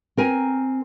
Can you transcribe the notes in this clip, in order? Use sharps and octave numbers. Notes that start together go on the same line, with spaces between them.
C4 A#4 G#5